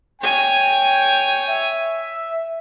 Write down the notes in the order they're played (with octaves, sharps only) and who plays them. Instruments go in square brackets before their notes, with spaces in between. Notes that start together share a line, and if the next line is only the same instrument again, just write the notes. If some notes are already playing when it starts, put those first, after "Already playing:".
[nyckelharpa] C#5 G#5 [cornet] G5
[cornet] E5